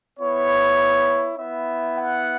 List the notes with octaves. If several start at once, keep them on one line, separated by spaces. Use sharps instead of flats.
B3 E4 C#5
B3 E4 E5
F#5